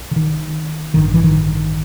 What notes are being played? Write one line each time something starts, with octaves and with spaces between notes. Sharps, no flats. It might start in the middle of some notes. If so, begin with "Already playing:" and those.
Already playing: B1
D3
D#3
A1 G2 D3 D#3
E3
D#3